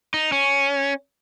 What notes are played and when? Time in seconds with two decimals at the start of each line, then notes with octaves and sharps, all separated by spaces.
0.14 D#4
0.32 C#4